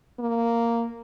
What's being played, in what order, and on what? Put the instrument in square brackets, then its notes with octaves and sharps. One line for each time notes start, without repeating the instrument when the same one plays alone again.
[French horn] A#3